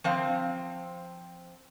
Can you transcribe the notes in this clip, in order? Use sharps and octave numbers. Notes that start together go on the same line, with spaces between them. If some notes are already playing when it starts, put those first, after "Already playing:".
F3 C4 F5